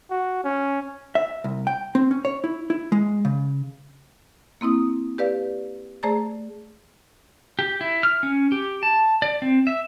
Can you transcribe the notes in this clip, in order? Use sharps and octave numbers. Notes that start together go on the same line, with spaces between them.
F#4
C#4
E5
C2
G5
C4
C#4
C#5
E4
E4
G#3
C#3
A#3 C4 E4 D#6
G4 B4 D5 F5
A3 G#4 C5 D5 A#5 A6
G4
E4
F6
C#4
G4
A5
D5
C4
E5